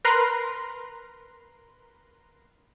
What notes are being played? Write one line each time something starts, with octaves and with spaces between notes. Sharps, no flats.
A#4 B4 A#5 C6